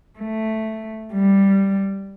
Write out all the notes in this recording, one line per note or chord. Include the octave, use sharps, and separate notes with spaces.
A3
G3